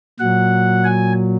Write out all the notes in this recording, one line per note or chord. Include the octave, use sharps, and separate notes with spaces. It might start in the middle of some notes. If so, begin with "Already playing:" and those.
A#2 F#3 F#5
G#5